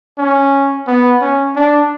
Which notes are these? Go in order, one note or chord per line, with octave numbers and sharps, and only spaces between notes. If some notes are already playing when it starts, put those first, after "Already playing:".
C#4
B3
C#4
D4